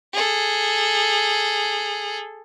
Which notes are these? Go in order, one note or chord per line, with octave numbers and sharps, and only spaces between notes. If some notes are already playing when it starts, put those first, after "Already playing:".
G#4 A4